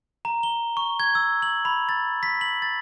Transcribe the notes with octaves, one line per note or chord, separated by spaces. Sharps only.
A#5
G7
C#6
G#6
E6
F#7
B5
A6
B6
F#7
A6